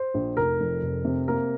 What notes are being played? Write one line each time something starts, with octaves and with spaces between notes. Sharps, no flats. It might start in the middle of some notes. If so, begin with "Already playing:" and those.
Already playing: C5
A#1
F1 A#4
F2
F1
C3
A#3 A#4